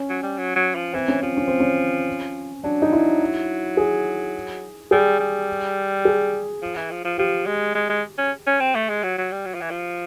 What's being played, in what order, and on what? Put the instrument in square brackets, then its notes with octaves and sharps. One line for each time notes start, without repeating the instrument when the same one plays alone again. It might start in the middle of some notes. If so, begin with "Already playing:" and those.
Already playing: [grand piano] C#4
[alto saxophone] F#3
G3
F#3
F#3
F3
[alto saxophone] E3 [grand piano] C4
[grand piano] C#4
[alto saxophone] F3 [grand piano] C4
[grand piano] C#4
C4
C#4
[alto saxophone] F#3 [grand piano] D4
[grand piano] D#4
E4
G#4
[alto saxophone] G3 [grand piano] G#4
[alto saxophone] G3
[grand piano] G#4
[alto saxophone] F3
E3
F3
F3
[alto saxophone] F3 [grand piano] G4
[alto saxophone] G#3
G#3
G#3
C#4
C#4
C4
A3
G#3
F#3
F#3
G3
F#3
F3
E3
F3